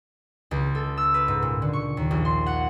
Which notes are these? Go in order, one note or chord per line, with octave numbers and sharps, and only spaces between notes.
C#2
A4
E6
B4
G#2
A#2
D3
C#6
D#2
A#1
C6
F#5